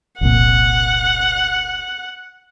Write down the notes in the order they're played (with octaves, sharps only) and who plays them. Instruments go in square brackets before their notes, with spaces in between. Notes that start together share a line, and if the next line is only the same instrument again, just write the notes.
[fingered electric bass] F1 C2 A#2 [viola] F#5